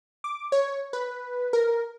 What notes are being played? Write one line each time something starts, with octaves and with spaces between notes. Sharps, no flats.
D6
C#5
B4
A#4